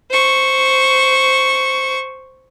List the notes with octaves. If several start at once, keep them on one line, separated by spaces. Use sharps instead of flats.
C5 C#6